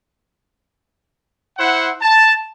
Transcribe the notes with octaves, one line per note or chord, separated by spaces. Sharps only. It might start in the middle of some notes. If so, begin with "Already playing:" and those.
E4 C5 F#5
A5